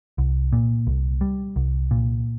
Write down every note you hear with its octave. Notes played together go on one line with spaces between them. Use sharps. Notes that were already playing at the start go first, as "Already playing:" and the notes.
C2
A#2
C2
G3
C2
A#2